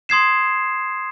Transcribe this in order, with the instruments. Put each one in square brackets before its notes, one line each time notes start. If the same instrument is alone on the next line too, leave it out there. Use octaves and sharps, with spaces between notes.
[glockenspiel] C6 D#6 G#6 C7 E7